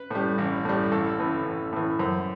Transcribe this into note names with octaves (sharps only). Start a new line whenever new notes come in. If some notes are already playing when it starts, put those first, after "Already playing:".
Already playing: B4
A2 G3
A1
A2 G3
A1 A4
A2 E3
A1
A2 E3
F#2 C5